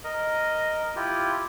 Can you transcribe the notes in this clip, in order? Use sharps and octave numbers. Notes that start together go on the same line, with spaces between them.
A#4 D#5
E4 F4 G4